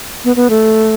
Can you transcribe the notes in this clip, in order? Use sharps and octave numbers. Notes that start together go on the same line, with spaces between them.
B3
B3
A3